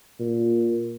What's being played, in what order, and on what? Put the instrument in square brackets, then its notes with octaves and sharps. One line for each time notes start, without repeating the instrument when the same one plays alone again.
[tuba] A#2